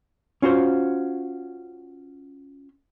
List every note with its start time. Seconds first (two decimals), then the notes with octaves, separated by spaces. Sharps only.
0.42 C#4 F4 F#4 C5